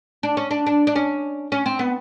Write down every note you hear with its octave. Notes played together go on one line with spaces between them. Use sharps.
D4
C#4
D4
D4
D4
C#4
C#4
C4
B3